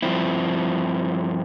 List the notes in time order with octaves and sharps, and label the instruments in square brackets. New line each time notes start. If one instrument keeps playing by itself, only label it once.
[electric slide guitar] G2 F3 C4 E4